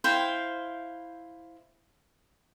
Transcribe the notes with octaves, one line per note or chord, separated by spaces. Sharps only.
E4 C5 F5 G5